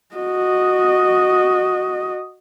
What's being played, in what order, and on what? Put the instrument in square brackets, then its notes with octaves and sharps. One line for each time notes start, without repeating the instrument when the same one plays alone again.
[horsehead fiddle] F#4 D#5